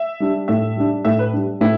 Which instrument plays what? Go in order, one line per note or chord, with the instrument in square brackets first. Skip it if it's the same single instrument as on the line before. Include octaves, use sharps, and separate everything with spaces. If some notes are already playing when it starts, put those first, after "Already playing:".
Already playing: [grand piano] E5
[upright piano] G3 D4
[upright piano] A2 [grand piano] E5
[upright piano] G3 D4
[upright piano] A2 [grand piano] E5
[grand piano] B4
[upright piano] G3 D4
[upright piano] A2 [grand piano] E4